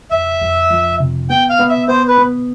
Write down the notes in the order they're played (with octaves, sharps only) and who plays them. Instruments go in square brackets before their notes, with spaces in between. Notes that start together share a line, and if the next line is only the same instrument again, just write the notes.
[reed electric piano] F2 [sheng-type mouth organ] E5
[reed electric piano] F2
F3
C3
[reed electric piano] B3 [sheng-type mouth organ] G5
[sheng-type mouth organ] F5
[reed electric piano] B3
[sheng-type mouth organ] E5
[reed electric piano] B3 [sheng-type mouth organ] C5
[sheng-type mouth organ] B4
[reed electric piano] B3